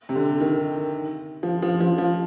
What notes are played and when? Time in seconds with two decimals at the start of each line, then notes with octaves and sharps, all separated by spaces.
0.09 C3
0.15 D3
0.40 D#3
1.43 F3
1.62 F3
1.80 F3
1.98 F3